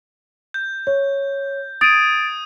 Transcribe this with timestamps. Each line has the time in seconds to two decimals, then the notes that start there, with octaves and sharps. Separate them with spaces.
0.54 G6
0.87 C#5
1.81 D#6 G#6 A6 D7 D#7